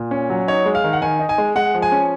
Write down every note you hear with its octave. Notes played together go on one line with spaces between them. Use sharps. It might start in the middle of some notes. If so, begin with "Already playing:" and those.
Already playing: A#2
C#4
F#3
D#4 C#5
G#3
F5
D#3
F#5
D#3 G#5
D#4
G#5
G#3
G#3 F#5
F3
G#5
C#4